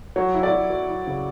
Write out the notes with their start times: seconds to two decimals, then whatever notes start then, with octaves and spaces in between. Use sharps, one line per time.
0.16 F#3 C#5
0.34 E4
0.43 D5
0.52 F#3
0.70 F#3
0.89 E4
1.07 C#3